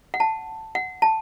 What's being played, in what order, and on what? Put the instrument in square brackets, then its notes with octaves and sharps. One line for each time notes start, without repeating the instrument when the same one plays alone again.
[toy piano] F#5
A5
F#5
A5